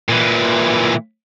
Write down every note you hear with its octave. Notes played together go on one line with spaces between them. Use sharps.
A#2 E3